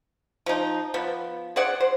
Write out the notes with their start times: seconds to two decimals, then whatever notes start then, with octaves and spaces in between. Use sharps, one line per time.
0.46 F3 D#4
0.94 F3 B3
1.56 G#4 C5 D5 F#5
1.80 C5